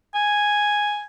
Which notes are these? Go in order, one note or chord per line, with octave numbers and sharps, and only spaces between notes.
G#5